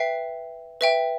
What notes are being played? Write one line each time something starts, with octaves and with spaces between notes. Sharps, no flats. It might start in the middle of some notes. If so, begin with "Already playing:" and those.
Already playing: B4 E5 G5 C7
B4 E5 G5